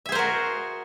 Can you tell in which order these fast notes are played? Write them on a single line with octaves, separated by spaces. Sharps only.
E5 G#4 C5 A#4 F#4